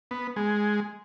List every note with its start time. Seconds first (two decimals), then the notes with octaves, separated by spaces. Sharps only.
0.11 B3
0.36 G#3